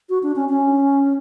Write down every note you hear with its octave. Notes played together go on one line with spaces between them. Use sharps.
F#4
D4
C#4
C#4